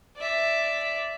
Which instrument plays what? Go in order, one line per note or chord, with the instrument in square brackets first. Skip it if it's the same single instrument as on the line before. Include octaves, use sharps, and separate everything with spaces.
[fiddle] D5 E5